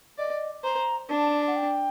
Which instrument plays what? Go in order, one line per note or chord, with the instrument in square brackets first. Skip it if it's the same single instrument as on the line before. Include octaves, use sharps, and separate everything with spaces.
[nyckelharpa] D5 [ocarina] D#5
[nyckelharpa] C5 [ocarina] A#5
[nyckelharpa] D4 [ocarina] A5
[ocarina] F#5
G5